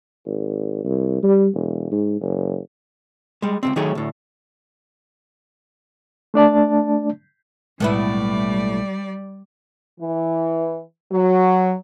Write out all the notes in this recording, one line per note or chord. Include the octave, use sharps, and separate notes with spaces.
G#1
C2
G3
E1
G#2
F#1
G3 G#3
C#2 G#2 C4
D#3 F#3 A3 G#4 C#5
D2 A2
A3 D4 D5 A5
B1 A2 G3 G#3 B3 E4 D5
E3
F#3